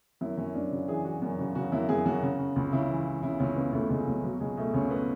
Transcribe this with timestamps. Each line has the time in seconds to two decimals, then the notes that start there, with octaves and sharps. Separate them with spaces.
0.21 F#2 E4
0.38 F#2 C#4
0.54 F#2 D4
0.71 C#3 F#4
0.88 E3 G#4
1.05 E3 F#4
1.22 F#2
1.39 C#3 F#4
1.55 C#3 F#4
1.72 F#2 E4
1.89 F#2 G#4
2.05 F#2 F#4
2.22 C#3
2.39 C#3
2.56 C#2
2.73 C#3 E4
2.89 E3
3.06 E3
3.23 C#3 E4
3.40 C#2 C#4
3.56 C#3 B3
3.73 C#2 A3
3.90 C#2 G#3
4.06 C#2 F#3
4.23 B2 F#3
4.40 C#2 G#3
4.57 B2 A3
4.74 C#2 C#4
4.90 B3